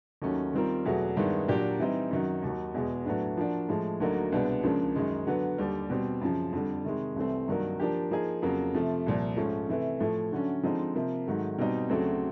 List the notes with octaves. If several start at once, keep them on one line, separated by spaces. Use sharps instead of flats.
D#2 D#3 F#3 A3 C#4
D#3 G3 C4 F4 A#4
E2 B2 F#3 A3
G2 D#3 G#3 B3 E4
A#2 F#3 A#3 D4 G4
E3 G3 C4 D#4
F#2 D#3 F#3
D#2 D#3 F#3
E2 B2 G#3
A2 F#3 B3 D4
F3 A#3 D4 F#4
A2 F3 G#3
D2 D3 F#3 A#3 D#4
C2 B2 G#3 B3 D4
C#2 C#3 F3 A#3 D4
F#2 D#3 G#3
D3 F#3 B3
D#2 D3 G3
B2 G3 C4
F#2 C#3 F3
F2 D3 G3
C3 D#3 G#3
C2 C3 E3 A3 C4
G2 D#3 F#3 A#3
F3 A#3 D4 G4
F3 A#3 D#4 G#4
F2 C#3 F#3 A#3
C3 F3 A3
C2 A#2 F3
G#2 F3 A3 C#4
C3 E3 A3
A2 F3 A3
D3 F#3 A3 C#4
D3 F3 G#3 C4 D#4
C3 F3 A#3
G#2 D#3 F#3 A3
B2 G3 C4 D#4
D2 C#3 F#3 A3 C4